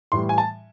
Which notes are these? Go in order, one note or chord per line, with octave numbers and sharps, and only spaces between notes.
A2 E3 G3 C6
G#5
A5